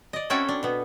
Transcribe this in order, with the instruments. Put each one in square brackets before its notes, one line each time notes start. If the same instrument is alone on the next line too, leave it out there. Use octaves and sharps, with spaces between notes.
[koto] D5 D#5
C4 C#4 E4 F#4 A4 G5
D4
B2 B3